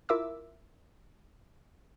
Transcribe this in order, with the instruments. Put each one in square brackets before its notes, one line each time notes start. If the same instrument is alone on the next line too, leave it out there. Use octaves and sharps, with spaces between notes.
[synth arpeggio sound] E4 F4 A#4 E5 D6 E6